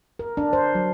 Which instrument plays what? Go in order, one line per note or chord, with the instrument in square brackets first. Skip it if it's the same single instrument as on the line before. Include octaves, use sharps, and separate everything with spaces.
[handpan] A#4
D4
C5
F#3